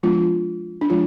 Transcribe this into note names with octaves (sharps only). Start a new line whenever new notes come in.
F3 G#3 B3 D4 F4
D4
F3 G#3 F4